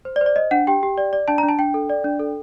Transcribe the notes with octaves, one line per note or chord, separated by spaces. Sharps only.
C5
D5
C5
D5
C5 D#5
D4 F#5
G4 G5
G4
D5
D5
D4 A5
A#5
D4
A5
D4 G5
A4
D5
D4
A4